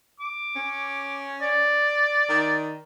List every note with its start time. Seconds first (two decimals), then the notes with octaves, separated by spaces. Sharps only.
0.20 D6
0.56 C#4
1.41 D5
2.29 D#3